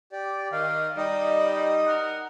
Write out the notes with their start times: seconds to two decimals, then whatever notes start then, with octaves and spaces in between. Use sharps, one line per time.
0.12 G4 D5
0.52 D#3 F5
0.97 G3 D#4 D#5
1.87 A#4 F#5